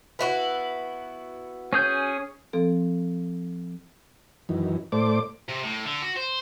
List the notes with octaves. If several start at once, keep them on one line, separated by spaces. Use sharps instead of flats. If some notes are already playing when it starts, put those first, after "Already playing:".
B3 E4 F#4
C#4 G#4 G6
F3 C4 A4
F#2 D#3 E3
A2 A3 C5 D5 D6
C3
A2
D3
F#4
C5